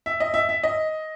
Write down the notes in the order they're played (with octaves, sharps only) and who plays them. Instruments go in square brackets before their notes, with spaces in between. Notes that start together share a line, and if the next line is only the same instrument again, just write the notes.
[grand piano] E5
D#5
E5
E5
D#5